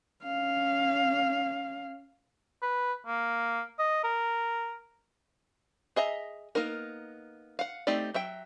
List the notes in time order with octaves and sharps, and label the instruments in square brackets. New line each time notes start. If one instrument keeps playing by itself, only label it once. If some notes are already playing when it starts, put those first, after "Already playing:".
[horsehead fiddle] C#4 F5
[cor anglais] B4
A#3
D#5
A#4
[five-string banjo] G#4 D#5 E5 A#5
A#3 B3 D#4 A#4
F5 F#5
A3 C4 D#4 G4 D5
F#3 E5 G5